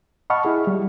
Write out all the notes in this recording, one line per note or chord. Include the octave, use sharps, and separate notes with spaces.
D#5 F#5 A5 B5 C#6 F6
E4 G#4
G3